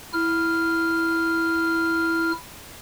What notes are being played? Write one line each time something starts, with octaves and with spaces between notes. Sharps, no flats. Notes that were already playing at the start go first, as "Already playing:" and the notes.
E4 F6